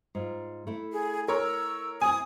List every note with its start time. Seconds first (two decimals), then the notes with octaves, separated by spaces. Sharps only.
0.15 G#2 F4
0.67 A3 E4
0.92 G#4
1.28 A#4 C#5 E6
2.01 C4 E4 G#5 D#6